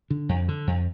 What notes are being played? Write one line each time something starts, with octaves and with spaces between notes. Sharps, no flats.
D3
F2
D3
F2